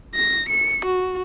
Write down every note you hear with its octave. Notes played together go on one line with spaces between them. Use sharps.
A#6
C#7
F#4